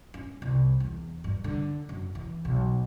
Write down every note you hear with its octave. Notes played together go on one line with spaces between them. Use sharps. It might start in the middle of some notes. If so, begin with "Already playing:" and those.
C#4
C2
E2
G2
D3
F#2
E3
B1